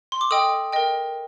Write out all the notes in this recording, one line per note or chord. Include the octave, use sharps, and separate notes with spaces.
C6
D6
A4 D#5 G5 D#6
A#4 D#5 G5